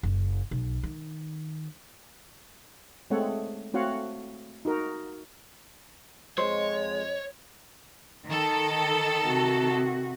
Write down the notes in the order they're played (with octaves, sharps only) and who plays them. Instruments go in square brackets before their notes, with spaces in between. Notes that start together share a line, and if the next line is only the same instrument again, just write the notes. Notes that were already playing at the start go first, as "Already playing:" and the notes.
[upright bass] F#1
B1
D#3
[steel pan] G#3 A3 C4 A4 C#5 F#5
A3 C4 F#4 C#5 F5 F#5
D#4 F#4 A#4
[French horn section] F2 D#5 [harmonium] G#3 [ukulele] C5 [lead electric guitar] C#5
[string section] D#3 A4
[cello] C3 F#4